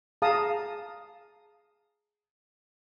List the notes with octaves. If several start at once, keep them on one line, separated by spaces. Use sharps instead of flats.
G#4 F5 A5 A#5 D#6